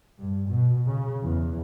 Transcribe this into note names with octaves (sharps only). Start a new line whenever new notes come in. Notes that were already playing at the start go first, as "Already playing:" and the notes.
G2
B2
C#3
E2